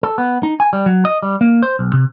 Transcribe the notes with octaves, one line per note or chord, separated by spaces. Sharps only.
A4
B3
D#4
G#5
G3
F#3
D#5
G3
A#3
C5
B1
C3